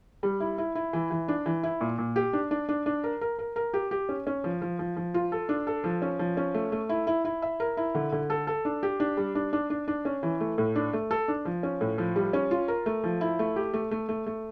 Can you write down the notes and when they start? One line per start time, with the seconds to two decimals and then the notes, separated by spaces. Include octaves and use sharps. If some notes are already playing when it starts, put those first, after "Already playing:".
0.23 G3
0.40 E4
0.58 E4
0.75 E4
0.93 E3
1.11 E3
1.28 D4
1.46 E3
1.63 E4
1.81 A#2
1.98 A#2
2.16 G4
2.33 D4
2.51 D4
2.69 D4
2.86 D4
3.04 A#4
3.21 A#4
3.39 A#4
3.56 A#4
3.74 G4
3.91 G4
4.09 C#4
4.27 C#4
4.44 F3
4.62 F3
4.79 F3
4.96 F3
5.14 F4
5.32 A4
5.49 D4
5.67 A4
5.84 F3
6.02 C#4
6.19 F3
6.37 C#4
6.54 A3
6.72 A3
6.89 E4
7.07 E4
7.25 E4
7.42 E5
7.60 A#4
7.77 E4
7.95 D3
8.12 D3
8.30 A4
8.47 A4
8.65 D4
8.83 G4
9.00 D4
9.17 G3
9.35 D4
9.53 D4
9.70 D4
9.88 D4
10.05 C#4
10.23 E3
10.40 A3
10.58 A2
10.76 D4
10.93 A3
11.11 A4
11.28 D4
11.45 F3
11.63 C#4
11.81 A2
11.98 F3
12.16 G3
12.33 C#4
12.51 F4
12.68 A#4
12.86 A3
13.04 F3
13.21 E4
13.39 A3
13.56 G4
13.74 A3
13.91 A3
14.09 A3
14.26 A3